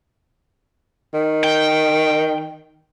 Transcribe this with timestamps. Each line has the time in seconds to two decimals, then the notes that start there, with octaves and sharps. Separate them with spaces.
1.14 D#3
1.44 G5